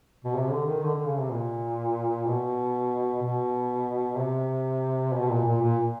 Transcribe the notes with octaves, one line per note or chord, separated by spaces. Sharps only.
B2
C3
D3
D#3
D3
D3
C#3
C3
A#2
B2
B2
C3
B2
A#2
A#2
A#2